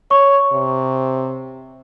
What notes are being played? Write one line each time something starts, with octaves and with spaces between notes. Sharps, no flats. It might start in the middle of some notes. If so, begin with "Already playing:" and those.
C#5 C#6
C3